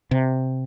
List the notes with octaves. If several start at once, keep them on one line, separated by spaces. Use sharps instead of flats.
C3